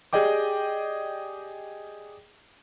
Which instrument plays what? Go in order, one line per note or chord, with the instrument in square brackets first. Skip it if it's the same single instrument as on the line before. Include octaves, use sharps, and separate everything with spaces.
[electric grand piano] G4 G#4 D5 D#5 G5 D6